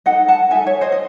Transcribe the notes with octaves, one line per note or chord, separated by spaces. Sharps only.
D#4 A4 D#5 F#5
F#5 A5
D#4 A4 E5 G#5
C#5 E5
C5 D#5
D#5